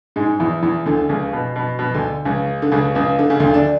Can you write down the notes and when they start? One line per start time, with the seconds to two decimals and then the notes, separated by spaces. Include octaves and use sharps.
0.16 G#2 G#3
0.39 E2 E3
0.63 E2 E3
0.86 D2 D3
1.09 C#2 C#3
1.33 B2
1.56 B2
1.79 B2
1.94 D2 D3
2.25 C#2 C#3
2.62 D3
2.72 C#2 C#3
2.95 C#2 C#3
3.19 D3
3.30 C#3
3.40 D2 D3
3.54 D4